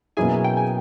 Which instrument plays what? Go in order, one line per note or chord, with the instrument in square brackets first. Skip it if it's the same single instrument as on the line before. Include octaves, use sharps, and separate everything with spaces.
[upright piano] B2 F#3 A#3 C#4 E4 [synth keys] G#4 G#5
[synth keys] G5
G#5